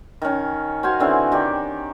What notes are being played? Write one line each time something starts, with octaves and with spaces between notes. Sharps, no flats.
D#3 C#4
F#4 C5 F5 G#5
D3 E3 C4 C#4
D#3 G4 D5